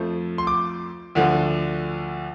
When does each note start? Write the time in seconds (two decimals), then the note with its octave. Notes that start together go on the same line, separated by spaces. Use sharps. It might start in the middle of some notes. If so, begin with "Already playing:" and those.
Already playing: F2 F3 A3
0.38 C6
0.47 D6
1.15 D2 D3 F3